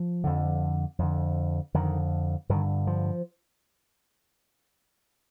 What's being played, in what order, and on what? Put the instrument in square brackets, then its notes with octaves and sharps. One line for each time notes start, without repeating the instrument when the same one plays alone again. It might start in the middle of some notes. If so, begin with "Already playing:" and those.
Already playing: [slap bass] F3
F2 D3
F2 D3
F2 D3 D#3
G2 D3 D#3
F3